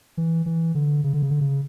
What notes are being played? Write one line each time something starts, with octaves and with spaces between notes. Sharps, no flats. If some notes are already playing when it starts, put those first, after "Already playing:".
E3
E3
D3
C#3
D3
C#3
D3
C#3